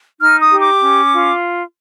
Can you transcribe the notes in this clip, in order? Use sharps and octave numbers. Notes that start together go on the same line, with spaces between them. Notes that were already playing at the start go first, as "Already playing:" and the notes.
D#4 F6
D#6
G4
D6
C#4
F4